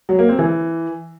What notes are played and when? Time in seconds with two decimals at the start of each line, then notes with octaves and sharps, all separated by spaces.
0.09 F#3
0.19 A#3
0.29 C4
0.39 E3